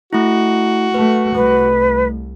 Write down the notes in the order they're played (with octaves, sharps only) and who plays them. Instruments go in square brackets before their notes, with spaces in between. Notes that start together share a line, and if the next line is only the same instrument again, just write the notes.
[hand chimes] A3 E4 [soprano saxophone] F#4
[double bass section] A3 [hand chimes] B4
[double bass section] C2 [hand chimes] A3 [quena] B4